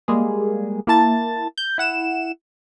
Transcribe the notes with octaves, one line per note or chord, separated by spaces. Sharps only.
G3 G#3 A#3 G#4
A#3 E4 A5 A6
G6
E4 F#5 E7